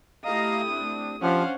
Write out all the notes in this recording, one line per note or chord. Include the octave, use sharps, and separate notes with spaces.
A3 E4 G4 D#5 F5 A#5 D#6
C4 D4
F3 C#4 D4 G4 C5 F5 F#5 F6